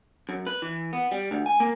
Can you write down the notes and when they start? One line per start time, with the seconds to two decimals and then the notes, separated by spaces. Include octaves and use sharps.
0.29 F#2
0.47 B4
0.62 E3
0.93 B3
1.11 G3
1.31 D2
1.46 G#5
1.60 A#3